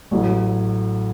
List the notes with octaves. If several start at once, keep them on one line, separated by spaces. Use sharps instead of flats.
A1 A2 F#3 A3